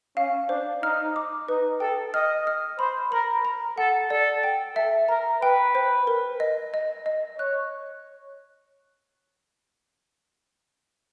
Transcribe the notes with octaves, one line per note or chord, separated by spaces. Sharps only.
C#4 F5
D4 C5
D#4 F6
D6
D#4 B4
A4 G5
D#5 F6
F6
C5 B5
A#4 B5
A#5
A4 F#5
A4 D5
G5
A4 E5
A#4 A#5
B4 G5
C5
A#4
D#5
D#5
D#5
C#5 F#6